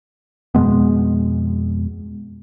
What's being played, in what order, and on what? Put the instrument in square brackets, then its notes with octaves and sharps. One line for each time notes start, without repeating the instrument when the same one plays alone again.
[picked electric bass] F2 B2 G#3 B3